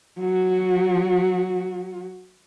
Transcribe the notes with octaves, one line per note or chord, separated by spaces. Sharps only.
F#3 F#4